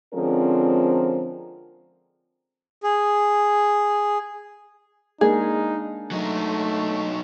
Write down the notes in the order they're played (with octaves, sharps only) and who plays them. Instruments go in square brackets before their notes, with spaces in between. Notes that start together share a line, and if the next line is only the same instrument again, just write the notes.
[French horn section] D3 F3 G#3 C4 C#4 A#4
[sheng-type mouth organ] G#4
[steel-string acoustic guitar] G#3 A#3 D4 [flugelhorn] D#4 [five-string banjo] G#4
[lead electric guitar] F#3 D#4 [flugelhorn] A3